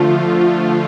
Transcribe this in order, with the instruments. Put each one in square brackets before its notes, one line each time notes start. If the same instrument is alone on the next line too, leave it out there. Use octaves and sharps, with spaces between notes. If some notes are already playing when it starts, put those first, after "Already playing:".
Already playing: [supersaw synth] D3 F3 A3 [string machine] F4